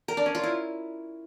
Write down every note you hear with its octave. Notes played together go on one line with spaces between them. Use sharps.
A#4
D4
C#4
F4
E4